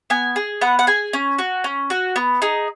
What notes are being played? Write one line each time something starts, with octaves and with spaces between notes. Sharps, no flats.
B3 G#5
G#4
B3 F#5
F#5
G#4 G#5
C#4
F#4
C#4
F#4
B3
D#4 G#4